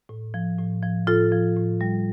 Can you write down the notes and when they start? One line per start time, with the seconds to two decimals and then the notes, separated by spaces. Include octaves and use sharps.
0.09 A2
0.34 F3
0.59 A2
0.83 F3
1.07 A2 F4 A4
1.32 F3
1.56 A2
1.81 G3